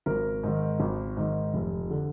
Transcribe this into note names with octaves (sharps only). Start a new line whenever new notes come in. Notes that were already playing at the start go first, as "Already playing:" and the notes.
G#1 A#4
G#2 D#3
G#1
G#2 D#3
F1
D3